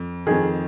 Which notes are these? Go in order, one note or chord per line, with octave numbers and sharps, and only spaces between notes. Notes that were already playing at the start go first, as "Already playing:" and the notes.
Already playing: F2
F2 D#3 G#4